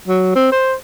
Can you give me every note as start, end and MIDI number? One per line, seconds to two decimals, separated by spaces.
0.08 0.31 54
0.35 0.51 60
0.52 0.74 72